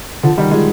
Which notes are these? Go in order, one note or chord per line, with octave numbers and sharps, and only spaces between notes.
D3 F3
D#3 G3
F3 G#3